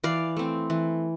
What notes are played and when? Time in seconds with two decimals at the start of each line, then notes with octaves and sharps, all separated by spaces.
0.04 E3 D5 F5
0.37 A3 C4
0.70 E3